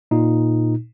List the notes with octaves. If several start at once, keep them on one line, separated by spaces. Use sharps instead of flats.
A#2 D#4